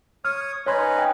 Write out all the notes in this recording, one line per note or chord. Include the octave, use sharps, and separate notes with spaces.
C#5 D#6 F6
C#4 D#4 B4 C#5 C6 G#6
G5